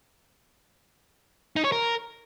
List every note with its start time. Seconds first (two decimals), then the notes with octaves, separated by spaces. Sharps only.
1.56 D#4
1.64 C#5
1.72 A#4